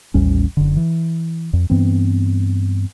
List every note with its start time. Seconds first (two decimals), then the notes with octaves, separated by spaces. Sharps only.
0.14 A1 D#2 G3 C#4
0.57 F#1 D3
0.77 E3
1.53 F2
1.70 G2 E3 B3 C4